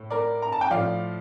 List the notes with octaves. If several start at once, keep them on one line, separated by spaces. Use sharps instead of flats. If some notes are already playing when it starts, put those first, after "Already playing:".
Already playing: A2
A#4 D5
A#5
A5
G5
A2 F3 D5 F5